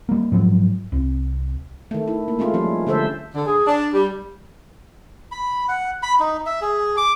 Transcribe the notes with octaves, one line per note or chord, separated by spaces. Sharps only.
G3 A#3
G#2 F3 F#3
C2
D#3 A3
E4
A#3
G#3 A3 C#4 F4
F3 G3 G#3 C#4
D3 A3 A4 C5 E5
D3
G#4
D4
G3
B5
F#5
B5
D#4
E5
G#4
D6